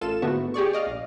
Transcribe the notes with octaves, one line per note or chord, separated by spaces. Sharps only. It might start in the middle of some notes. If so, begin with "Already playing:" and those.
A1 F4 A4 E7
G#2 D3 A3 B3 E4 F#4
G4 G#4 D5 C#6
D5 D#5 F5
A#1